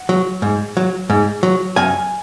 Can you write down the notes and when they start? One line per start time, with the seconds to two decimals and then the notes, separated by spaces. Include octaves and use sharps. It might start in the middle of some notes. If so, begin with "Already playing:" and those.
Already playing: F#5
0.09 F#3
0.42 G#2
0.77 F#3
1.10 G#2
1.43 F#3
1.76 F#2 G#5